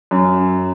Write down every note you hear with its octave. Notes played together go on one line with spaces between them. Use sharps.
F#2